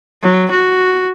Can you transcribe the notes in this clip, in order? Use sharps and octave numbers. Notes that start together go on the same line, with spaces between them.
F#3
F#4